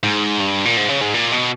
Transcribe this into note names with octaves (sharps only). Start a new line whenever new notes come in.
G#2
G2
A#2
G#2
C#3
G#2
A#2
B2